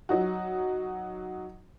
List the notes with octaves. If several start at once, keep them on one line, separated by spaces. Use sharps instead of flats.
F#3 D#4 F#4